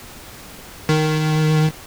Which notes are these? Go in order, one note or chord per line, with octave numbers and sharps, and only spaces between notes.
D#3